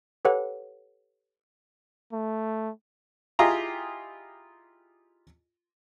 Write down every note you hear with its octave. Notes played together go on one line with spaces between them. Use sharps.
G4 A4 B4 C#5 F#5
A3
E4 F4 G4 G#4 D#5 A#5